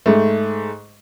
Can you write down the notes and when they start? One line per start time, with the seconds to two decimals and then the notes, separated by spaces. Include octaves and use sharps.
0.06 G#2 A3